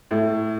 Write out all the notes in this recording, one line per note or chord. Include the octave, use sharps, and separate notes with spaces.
A2